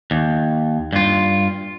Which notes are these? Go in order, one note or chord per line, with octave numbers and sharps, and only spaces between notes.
D#2
G2 F4